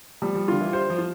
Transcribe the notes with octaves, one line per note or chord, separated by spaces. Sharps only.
F3 G3
F3
D3 F4
E3
G3 C5
F3
F4